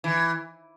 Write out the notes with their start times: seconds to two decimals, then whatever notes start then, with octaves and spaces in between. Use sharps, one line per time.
0.04 E3